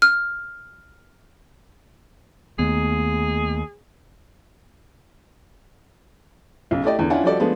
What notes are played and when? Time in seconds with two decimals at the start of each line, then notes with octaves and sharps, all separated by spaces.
0.02 F6
2.59 D#2 A3 B3 G#4
6.71 B1 C#3
6.84 A3 E4 G4 D5 D#5
6.99 E2 D3
7.10 C#4 D4 E4 F4 F#5 G#5
7.24 F3 G3 F#4 A4 D5 D#5
7.40 F3 G#3 A3 B3 D4